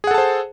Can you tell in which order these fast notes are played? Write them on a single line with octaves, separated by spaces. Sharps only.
G#4 F#5 A4 A5 C5